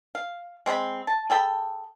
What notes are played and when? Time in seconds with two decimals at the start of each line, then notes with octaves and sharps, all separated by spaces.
0.15 F5
0.66 G#3 C4 D5 B5
1.07 A5
1.30 G#4 A4 G5 B5